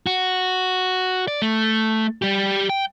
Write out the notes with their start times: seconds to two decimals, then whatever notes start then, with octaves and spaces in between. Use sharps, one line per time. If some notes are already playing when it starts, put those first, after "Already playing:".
0.06 F#4
1.28 D5
1.42 A3
2.22 G3 G4
2.70 G5